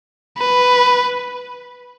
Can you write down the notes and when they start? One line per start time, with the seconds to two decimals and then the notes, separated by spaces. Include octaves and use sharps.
0.38 B4